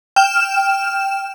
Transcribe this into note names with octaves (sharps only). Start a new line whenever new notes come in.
G5 F6 E7